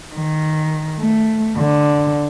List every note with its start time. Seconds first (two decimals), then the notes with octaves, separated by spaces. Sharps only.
0.14 D#3
0.99 A3
1.58 D3